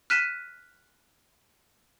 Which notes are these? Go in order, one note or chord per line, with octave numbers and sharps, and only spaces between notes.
F6 F#6 B6 D#7 E7